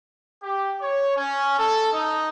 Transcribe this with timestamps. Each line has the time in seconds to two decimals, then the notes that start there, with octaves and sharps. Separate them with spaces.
0.43 G4
0.82 C#5
1.17 C#4
1.59 A4
1.93 D#4